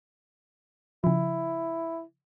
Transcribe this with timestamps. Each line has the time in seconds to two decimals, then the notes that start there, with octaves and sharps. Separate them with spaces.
1.04 C#3 F3 E4